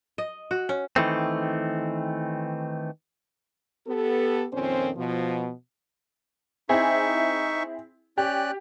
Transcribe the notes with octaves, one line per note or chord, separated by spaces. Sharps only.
D#5
F#4
C#4
D#3 E3 A3 C4
B3 G4 A4
F2 A#2 D#3 C4 C#4 C5
B2 F3
C4 D#4 E4 G#4 E5 C#6
C#4 G4 D5 F#6